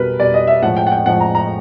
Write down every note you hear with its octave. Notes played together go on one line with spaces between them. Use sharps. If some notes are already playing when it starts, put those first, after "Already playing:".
Already playing: B2 G3 A#4 B4
B2 G3 D5
D#5
E5
A2 F3 G#3 F#5
G5
F#5
G5
A2 F3 G#3 F#5
A#5
A#5